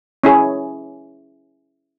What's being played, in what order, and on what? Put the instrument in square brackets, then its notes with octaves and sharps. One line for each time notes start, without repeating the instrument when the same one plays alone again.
[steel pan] C#4 E4 G#4 C#5